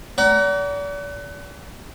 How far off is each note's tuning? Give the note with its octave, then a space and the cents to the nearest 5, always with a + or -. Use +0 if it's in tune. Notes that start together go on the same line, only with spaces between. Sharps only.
D5 -40 F#5 +35 A#5 +10